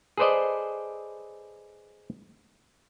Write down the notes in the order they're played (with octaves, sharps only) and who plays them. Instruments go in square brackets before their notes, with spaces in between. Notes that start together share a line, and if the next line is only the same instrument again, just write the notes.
[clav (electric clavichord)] G#4 A4 B4 C5 D5 D#5